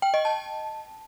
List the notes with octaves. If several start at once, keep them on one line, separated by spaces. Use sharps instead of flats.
G5
D#5
A5